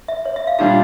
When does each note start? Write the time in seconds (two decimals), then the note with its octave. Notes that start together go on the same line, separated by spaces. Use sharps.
0.08 E5
0.25 C#5
0.36 E5
0.47 F5
0.59 A#2 G3 D4 F4 F5